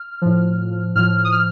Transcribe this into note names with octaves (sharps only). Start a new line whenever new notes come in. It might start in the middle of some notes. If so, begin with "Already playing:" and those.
Already playing: F6
A2 F3
A2 F3 F6
D#6
F6